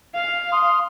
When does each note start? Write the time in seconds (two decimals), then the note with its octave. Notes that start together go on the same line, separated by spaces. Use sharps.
0.15 F5
0.52 C6 D#6